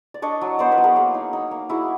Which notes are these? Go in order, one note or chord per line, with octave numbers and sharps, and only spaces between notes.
D5
D4 C#5 D#5
F#3
B3 C5 D5
B4 C#5
F#3
G#4 A#4
A#3
D#4
D#4
A#3
E4 F#4 G#4